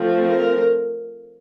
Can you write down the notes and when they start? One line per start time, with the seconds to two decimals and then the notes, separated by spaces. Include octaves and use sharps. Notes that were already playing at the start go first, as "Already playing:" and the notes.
Already playing: F3 A3 C4
0.27 A#4